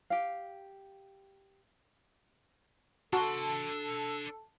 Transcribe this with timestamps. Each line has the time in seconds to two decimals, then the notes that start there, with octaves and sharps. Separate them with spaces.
0.10 G4 F5
3.13 D4 F#4 A4 A5 C6